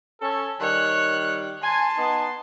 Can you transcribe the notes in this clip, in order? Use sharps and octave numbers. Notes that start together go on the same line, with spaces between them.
C#4 A4
D#3 G3 C#5 F#6
G#5 A5 C6
B3 D#4